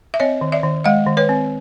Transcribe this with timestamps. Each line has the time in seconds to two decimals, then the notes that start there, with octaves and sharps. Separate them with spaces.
0.14 E5
0.20 C4 C#5 D#5
0.41 D#3
0.52 D5 E5
0.63 D#3
0.84 G#3 D#5 F5
1.07 D#3
1.17 B4 C#5
1.29 C4